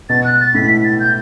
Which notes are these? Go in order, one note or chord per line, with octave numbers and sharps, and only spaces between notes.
B2 A6
F#6
A6
A2 B6
A6
G6